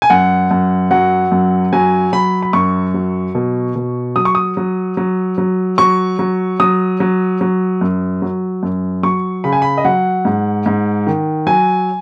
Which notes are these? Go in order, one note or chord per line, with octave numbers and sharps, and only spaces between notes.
G#5
F#2 F#5
F#2
F#3 F#5
F#2
F#3 G#5
F#3 B5
B5
F#2 C#6
F#3
B2
B2
F#3 D#6
C#6
D#6
F#3
F#3
F#3
F#3 C#6
F#3
F#3 D#6
F#3
F#3
F#2
F#3
F#2
F#3 C#6
C#3 B5
G#5
B5
D#5
F#3 F#5
G#2
G#2
D#3
F#3 G#5